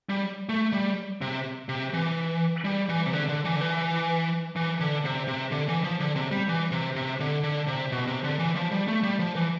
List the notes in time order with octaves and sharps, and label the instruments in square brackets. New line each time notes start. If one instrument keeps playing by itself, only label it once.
[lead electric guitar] G3
A3
G3
C3
C3
E3
G3
E3
C3
D3
D3
E3
D3
E3
E3
D3
C3
C3
D3
E3
F3
D3
C3
G3
E3
C3
C3
D3
D3
C3
B2
C3
D3
E3
F3
G3
A3
G3
F3
E3